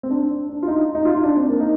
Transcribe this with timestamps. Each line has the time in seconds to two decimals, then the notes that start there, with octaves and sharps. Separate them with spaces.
0.03 C4
0.10 D4
0.49 D4
0.63 F4
0.67 D#4
0.95 D#4
1.05 F4
1.15 D#4
1.24 D4
1.36 C4
1.49 A#3
1.60 D#4